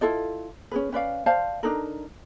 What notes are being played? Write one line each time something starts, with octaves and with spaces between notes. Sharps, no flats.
E4 F4 A4 D#5
C#4 G#4 B4
C#4 B4 D5 F5
C5 D5 F5 A5
D4 D#4 A4 A#4